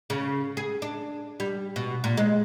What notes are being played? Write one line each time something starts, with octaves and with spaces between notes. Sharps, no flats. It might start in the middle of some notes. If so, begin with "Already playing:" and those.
C#3
G#4
D4
G3
B2
A#2
G#3